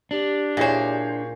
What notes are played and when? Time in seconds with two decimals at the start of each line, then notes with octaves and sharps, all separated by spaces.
0.11 D4 G4
0.57 A#2 E4 G#4 C5 C#5